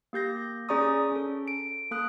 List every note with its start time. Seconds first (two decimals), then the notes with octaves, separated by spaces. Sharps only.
0.13 A#3 G4 G6 A#6
0.69 C#4 G#4 D5 A#5 C#6 D#6
1.12 C#4 A4
1.48 D7
1.91 A#3 A4 D#6 F#6